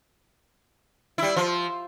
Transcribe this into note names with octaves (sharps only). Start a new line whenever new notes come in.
G3 E4
F3